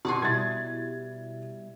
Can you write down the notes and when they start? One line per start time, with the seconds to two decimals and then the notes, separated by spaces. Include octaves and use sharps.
0.05 B2 D5 F#5 G#5 C6
0.22 B2 G3 E4 G#6 A6